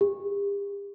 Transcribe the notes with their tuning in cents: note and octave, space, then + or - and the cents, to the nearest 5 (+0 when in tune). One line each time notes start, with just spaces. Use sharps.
G4 +45